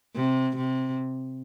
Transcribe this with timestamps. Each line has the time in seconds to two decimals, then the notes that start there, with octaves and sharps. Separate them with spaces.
0.16 C3
0.56 C3